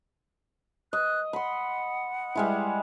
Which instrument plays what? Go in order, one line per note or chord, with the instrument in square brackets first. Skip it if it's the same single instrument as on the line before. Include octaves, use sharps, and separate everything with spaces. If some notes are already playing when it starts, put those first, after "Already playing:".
[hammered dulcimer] D#5 [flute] F#6
[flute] F#5 [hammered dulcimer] B5 C6
[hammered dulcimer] G3 G#3 E4